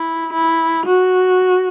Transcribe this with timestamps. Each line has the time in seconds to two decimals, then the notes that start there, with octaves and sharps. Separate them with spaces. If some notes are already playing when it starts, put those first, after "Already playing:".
Already playing: E4
0.33 E4
0.86 F#4